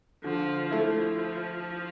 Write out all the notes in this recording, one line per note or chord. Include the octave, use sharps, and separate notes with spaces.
D3 F3
F3 A3 E4